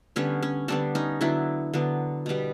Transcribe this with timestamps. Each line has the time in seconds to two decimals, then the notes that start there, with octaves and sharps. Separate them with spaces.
0.16 D3 G3 B3 C#4
0.43 C#4
0.68 D3 G3 B3 C4 D4
0.95 C#4 D#4
1.21 D3 F#3 B3 D4 E4
1.73 D3 F#3 B3
2.26 B2 G3 B3